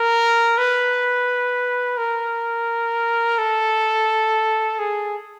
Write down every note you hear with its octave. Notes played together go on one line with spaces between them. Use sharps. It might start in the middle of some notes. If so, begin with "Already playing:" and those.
Already playing: A#4
B4
A#4
A4
G#4